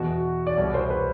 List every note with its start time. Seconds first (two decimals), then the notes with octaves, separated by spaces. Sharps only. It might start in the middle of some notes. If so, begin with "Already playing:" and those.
Already playing: E2 B2 F#4
0.47 D5
0.57 C2 B2 C#5
0.74 C5
0.90 B4